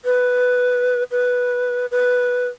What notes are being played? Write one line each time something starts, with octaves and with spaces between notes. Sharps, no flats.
B4
B4
B4